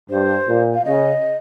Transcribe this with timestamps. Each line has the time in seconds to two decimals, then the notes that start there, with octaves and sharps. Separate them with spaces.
0.10 G2 C5
0.48 A#2
0.74 F5
0.85 C#3 D#5